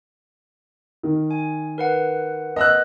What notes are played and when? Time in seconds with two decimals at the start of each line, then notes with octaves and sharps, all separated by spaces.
1.03 D#3
1.31 G#5
1.78 A#4 B4 F#5
2.56 D#5 E6 F#6